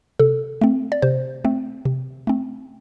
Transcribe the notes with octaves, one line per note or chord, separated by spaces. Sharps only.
C3 A4
A3 C4
D5
C3 C5
A3 C4
C3
A3 C4